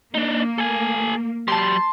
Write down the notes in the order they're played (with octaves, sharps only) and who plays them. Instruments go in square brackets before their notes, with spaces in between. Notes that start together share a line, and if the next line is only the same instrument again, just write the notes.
[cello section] A#3 [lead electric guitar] D4 D#4
[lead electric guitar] A4 G#5
[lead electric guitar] F#3 G4 [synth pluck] A5 C6